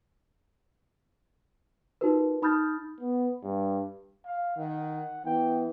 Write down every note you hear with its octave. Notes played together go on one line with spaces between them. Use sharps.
D#4 F4 F#4 A#4 B4
D#4 B5 D#6 F6 G6 A6
B3
G2
F5
D#3 F#5
E3 B3 G5